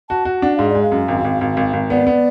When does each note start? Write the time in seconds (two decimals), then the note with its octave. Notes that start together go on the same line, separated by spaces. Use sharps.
0.09 F#4 A5
0.25 F#4
0.42 D4 F#5
0.56 G#2 F5
0.69 D5
0.75 G#3
0.83 F5
0.92 F#2
1.08 G#1
1.25 G#1
1.41 G#1
1.57 G#1
1.73 G#1
1.90 B3 D5
2.07 B3